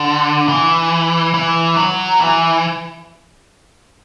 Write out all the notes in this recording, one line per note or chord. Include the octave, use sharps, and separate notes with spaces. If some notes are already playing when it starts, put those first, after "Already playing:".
Already playing: D3
E3
E3
F#3
E3